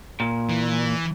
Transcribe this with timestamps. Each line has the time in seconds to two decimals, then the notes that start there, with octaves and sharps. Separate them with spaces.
0.20 A#2
0.50 E3